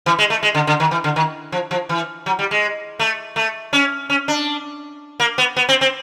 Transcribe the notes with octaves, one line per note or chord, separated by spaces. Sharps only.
E3
G#3
A3
G#3
D3
D3
D#3
E3
D3
D#3
F3
F3
E3
F#3
G3
G#3
A3
A3
C#4
C#4
D4
A#3
B3
B3
C4
C4